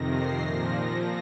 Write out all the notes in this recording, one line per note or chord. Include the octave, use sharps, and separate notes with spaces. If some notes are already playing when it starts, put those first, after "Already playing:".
Already playing: F2 C3 D#3 A#6
C7
A#2 F3 A#6